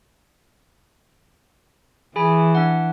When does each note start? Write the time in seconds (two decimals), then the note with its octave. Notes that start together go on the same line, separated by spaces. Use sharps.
2.16 E3 G#4 G#5 B5
2.55 D4 F#5